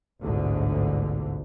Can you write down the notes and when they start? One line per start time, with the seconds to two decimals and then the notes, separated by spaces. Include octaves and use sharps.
0.22 A1 D2 G#2 B2 D3